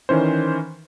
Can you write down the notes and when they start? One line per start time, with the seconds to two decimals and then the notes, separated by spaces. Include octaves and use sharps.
0.09 D#3 E3 C#4 C5